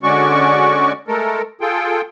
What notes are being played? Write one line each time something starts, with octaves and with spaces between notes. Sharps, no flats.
D3 G#3 C#4 F#4 D5 C#6
G#3 A3 A4 A#4
F4 G#4 A4 G5